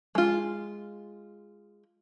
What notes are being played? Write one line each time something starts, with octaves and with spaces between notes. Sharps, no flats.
G#3 F4